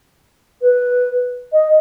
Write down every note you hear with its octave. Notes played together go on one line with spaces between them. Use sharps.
B4
D#5